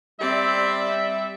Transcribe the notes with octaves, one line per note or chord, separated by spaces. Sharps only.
G3 C4 D5 E5